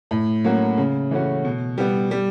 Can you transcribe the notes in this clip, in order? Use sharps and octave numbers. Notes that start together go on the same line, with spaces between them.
A2
F#3 A#3 C#4 F#4
C#3
E3 A3 C#4 F#4
B2
G3 B3
G3